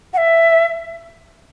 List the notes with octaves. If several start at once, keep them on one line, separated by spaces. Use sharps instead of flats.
F#5
E5